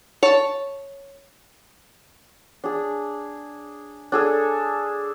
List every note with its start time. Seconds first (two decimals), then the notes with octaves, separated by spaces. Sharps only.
0.23 C#5 A5
2.64 D4 G#4
4.12 D4 G#4 A4